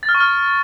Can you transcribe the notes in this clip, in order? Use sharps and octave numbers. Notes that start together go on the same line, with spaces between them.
A6
F6
C#6
F6